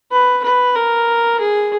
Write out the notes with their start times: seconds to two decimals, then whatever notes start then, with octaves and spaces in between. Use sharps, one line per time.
0.11 B4
0.44 B4
0.75 A#4
1.40 G#4